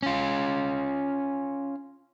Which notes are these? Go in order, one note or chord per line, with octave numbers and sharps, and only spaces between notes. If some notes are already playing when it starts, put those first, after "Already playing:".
C#4 F4